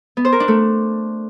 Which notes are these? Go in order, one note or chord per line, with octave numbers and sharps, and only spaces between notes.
B3
C5
A#4
D4
A3